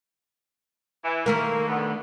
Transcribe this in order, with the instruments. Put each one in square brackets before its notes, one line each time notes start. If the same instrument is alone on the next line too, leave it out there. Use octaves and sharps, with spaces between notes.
[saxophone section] E3
[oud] D#3 A3 A#4 [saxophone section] A#3
[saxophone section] G2 D3 B3